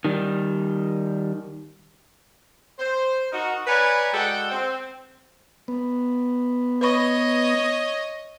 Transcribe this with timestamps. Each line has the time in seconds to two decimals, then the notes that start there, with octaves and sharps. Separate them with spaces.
0.05 D#3 G3
2.79 C5
3.32 D#4 F#4 A#4
3.66 B4 C#5 D5 G#5 A#5 B5
4.12 G#3 F#4 A4 D5 F#5 G5
4.51 C4
5.68 B3
6.81 B4 C#5 D#5 B5 C#6